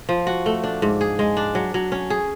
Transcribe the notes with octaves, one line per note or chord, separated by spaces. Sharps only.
F3
F#4
A3
D4
G#2
G#4
G#3
D4
F#3
F#3
C#4
G#4